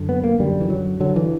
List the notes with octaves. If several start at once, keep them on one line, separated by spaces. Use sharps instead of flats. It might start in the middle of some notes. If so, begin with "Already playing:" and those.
Already playing: F#2 D3
B3
A#3
F#2 D3 G3
E3
F#3
G2 D3 F#3
E3